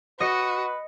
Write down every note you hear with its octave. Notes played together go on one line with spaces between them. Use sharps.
F#4 B4 D#5 C#7